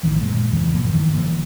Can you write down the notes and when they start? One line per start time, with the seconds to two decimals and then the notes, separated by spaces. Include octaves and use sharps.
0.03 A1 A2 D#3 E3
0.21 F#2 A#2 G#3
0.52 F1 E2 C#3 E3
0.74 G#2 B2 F3 A#3
0.89 F#2 D#3 E3
1.13 G1 D3 E3 A#3